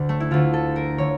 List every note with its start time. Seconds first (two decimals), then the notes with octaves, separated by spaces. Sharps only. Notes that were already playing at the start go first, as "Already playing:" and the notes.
Already playing: D2 D3
0.09 A3
0.20 E4
0.31 D2 D3 F4
0.53 A4
0.76 A#4
0.98 D3 C#5